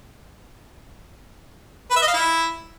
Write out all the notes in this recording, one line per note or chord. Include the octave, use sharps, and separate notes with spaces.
B4
E5
D#5
F5
E4